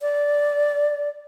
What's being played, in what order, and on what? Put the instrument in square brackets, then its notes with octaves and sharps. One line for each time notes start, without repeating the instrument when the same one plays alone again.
[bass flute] D5